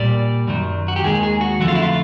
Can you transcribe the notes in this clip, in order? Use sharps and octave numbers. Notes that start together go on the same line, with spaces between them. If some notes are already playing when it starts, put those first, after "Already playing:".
Already playing: A#2 G3 D5
F#2 D#3 F#3
F#4
G4
D#2 D#3 G#3 G#4
G#4
F#4
F2 D3 F#3 A3 F#4
F4
E4
F4